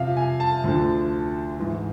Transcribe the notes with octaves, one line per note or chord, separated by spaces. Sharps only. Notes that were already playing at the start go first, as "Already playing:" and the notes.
Already playing: F2 C3 F3 E5 F5
G#5
A5
D2 D3 F3
G#2 E3